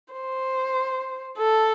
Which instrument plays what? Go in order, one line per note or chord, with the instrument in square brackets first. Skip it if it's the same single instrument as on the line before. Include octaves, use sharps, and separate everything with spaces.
[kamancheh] C5
A4